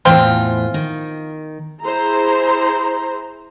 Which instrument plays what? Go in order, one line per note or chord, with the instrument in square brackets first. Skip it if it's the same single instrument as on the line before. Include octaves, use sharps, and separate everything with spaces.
[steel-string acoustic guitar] E2 A2 E3 [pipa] F3 C4 F4
[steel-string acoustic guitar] D#3
[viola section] E4 G#4 C5 A#5